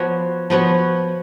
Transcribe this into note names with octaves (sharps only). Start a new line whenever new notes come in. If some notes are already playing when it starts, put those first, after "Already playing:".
Already playing: F3 B3 F#4 C#5
F3 B3 F#4 C#5